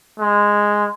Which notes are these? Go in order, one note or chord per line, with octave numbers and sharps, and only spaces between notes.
G#3